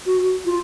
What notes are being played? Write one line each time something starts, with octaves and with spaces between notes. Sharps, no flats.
F#4
F4